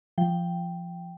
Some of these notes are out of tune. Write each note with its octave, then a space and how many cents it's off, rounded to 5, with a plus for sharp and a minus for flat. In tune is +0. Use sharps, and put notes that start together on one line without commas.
F3 -20 G5 +0